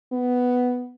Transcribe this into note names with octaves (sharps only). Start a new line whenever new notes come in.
B3